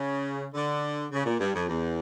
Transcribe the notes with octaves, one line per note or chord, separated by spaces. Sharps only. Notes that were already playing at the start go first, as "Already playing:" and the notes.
Already playing: C#3
D3
C#3
A#2
G2
F2
E2